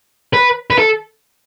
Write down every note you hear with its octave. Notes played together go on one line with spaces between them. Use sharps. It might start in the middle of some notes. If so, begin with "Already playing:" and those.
B4
B4
A4